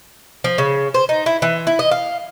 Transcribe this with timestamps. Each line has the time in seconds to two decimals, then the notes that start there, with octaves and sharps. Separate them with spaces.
0.44 F3
0.58 C#3
0.94 C5
1.09 D#4
1.26 E4
1.42 E3
1.67 E4
1.79 D#5
1.91 F5